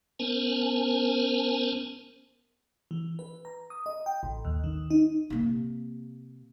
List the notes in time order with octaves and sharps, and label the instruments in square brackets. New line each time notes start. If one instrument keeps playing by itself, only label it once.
[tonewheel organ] B3 C#4 A#4 C5 G#5 A5
[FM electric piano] E3
B4
A#5
D#6
D#5
G5
A1
D#2
D#3
D#4
[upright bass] C3 A#3